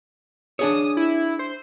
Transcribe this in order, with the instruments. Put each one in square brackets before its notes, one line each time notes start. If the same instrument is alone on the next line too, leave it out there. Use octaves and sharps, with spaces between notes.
[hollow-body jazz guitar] D4 G#4 C#5 [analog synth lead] D#6
[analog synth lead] E4
C5